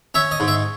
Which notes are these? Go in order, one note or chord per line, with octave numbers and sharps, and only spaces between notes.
C#4 E5
D#5
G#2
E5